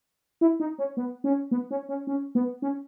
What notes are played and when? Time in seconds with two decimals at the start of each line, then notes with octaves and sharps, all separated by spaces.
0.41 E4
0.60 D#4
0.78 C#4
0.97 B3
1.24 C#4
1.51 B3
1.71 C#4
1.89 C#4
2.07 C#4
2.35 B3
2.62 C#4